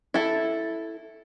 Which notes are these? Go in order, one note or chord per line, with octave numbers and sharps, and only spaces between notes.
E4 A4